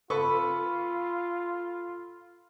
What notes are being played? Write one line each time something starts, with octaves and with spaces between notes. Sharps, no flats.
F4 A4 B4 B5 C#6